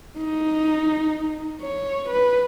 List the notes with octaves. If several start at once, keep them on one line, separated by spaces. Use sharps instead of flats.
D#4
C#5
B4